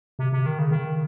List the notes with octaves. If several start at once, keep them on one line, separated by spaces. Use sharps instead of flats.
C3
C3
D#3
C#3
D#3